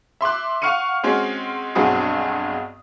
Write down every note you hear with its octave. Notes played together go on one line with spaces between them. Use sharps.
E5 C6 D6 F#6
F5 F#5 C#6 F6 C#7 D#7
G#3 C4 C#4 F#4
B1 G2 C4 F#4 G#4 D#6